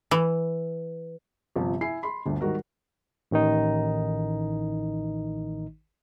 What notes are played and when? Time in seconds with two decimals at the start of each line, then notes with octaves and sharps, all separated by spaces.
0.11 E3
1.56 G1 C3 F3
1.81 E4 G#5 C7
2.03 B5 C6
2.25 G1 D2 D3
2.41 G#2 D#3 G3 F#4 A#4
3.31 A1 D#3 D#4